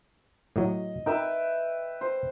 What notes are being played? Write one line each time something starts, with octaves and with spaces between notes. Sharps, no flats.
A2 F#3 D#5
D#4 A#4 B4 E5 G5
C5